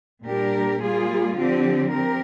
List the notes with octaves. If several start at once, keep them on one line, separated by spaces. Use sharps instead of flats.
A#2 G3 D4 G4 A#4
G3 A#3 F4 G#4
D3 F3 C4 G4
C4 G4 A#4